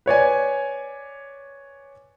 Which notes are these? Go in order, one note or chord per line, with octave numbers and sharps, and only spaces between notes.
B4 C#5 D5 G#5